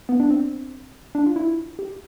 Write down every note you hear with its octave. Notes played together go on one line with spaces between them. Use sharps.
B3
D4
C4
D4
F4
E4
G4